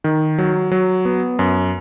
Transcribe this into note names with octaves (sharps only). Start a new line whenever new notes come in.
D#3
F#3
F#3
B3
F#2